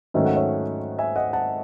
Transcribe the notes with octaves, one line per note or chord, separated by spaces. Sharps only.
G#2 D#3 F#3 A3 C#4 E5
F#5
C#5 E5
E5 G#5
D#5 F#5
F#5 A5